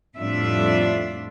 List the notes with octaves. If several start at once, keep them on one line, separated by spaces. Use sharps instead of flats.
F2 A2 G3 D4 F4 E5